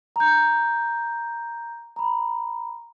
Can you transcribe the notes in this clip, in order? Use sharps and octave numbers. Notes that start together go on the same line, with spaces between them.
A#5 G6
A#5 B5